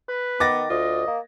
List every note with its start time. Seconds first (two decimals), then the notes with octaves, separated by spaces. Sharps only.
0.09 B4
0.40 D#3 B3 D6 A6 A#6
0.70 D2 F4 D#5
1.07 A#3